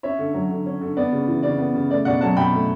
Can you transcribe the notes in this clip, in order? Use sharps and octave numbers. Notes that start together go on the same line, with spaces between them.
C#4 C#5 E5
D3
F#3
D3
C#4
D3
B3 D5
C#3
E3
C#3 D5
B3
C#3
A3 D5
B2 D5 F#5
F#3 F#5 A5
B2 G5 B5
A3